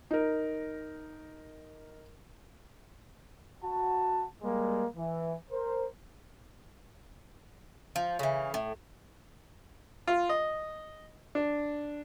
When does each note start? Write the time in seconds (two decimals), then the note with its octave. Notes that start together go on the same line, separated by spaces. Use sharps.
0.11 D#4 A#4
3.62 F#4 A5
4.42 G3 G#3 A#3
4.97 E3
5.51 A#4 C5
7.96 F3
8.19 C#3 E3
8.54 A2
10.07 F4
10.29 D#5
11.35 D4